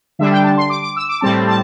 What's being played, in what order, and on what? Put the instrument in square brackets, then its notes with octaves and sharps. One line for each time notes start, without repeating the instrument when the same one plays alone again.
[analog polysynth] D3 G3 D4 E5
G5
A5
C6
D6
D6
E6
D6
A2 G3 C4 A5
A5